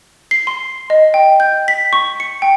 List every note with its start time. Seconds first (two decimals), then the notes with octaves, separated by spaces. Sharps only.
0.31 C7
0.47 C6
0.90 D#5
1.14 G5
1.40 G6
1.68 B6
1.93 C#6
2.20 C#7
2.42 G5